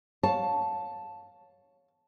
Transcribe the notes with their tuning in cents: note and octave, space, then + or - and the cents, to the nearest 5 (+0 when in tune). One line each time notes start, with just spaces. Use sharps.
C#5 +0 F5 +25 A5 +0